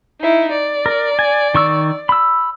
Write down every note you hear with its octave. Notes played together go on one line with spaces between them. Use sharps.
D#4 E4
D5
A#4
G#5
D#3 C#6 E6
B5 E6